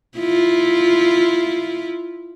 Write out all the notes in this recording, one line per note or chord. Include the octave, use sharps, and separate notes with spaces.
E4 F4